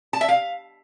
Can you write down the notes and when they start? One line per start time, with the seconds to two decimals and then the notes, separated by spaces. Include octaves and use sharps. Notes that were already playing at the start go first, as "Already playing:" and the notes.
0.13 A5
0.21 E5
0.29 F5